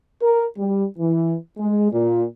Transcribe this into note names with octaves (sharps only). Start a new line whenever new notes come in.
A#4
G3
E3
G#3
A#2